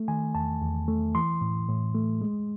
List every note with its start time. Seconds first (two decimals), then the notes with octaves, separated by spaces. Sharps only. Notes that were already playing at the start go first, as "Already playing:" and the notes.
Already playing: A3
0.08 D#3 G#5
0.35 E2 A5
0.61 E2
0.88 A3
1.15 E3 C6
1.41 A2
1.68 A2
1.95 A3
2.22 G#3